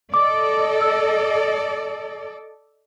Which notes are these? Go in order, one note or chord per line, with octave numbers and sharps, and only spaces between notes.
A4 D5 D#5 D6
E6